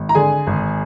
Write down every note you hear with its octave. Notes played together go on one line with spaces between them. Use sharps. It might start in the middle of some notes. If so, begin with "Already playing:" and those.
Already playing: G#1
A#5
D3 G#4 G#5
G#1